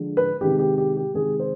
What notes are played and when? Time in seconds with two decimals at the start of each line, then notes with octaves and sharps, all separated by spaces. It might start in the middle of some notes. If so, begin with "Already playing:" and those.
Already playing: D3 F3 G#3
0.17 B4
0.41 C3 D#3 G#3 G4
0.59 G4
0.78 G4
0.97 G4
1.14 C3 D#3 G#3 G#4
1.39 C5